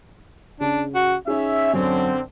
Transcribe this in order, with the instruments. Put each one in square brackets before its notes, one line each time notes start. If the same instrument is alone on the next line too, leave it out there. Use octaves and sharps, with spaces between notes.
[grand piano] C#3 [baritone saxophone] D4
[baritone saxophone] F#4
[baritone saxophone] C#4 [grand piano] D#4 G#4 [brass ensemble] E5
[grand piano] F#2 [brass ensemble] D3 C4